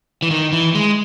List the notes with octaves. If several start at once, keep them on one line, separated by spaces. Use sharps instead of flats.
E3
D#3
E3
G#3